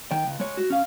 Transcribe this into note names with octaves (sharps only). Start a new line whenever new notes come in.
D#3 G5
C#2
G#3 C#5
F#4
C#4 F5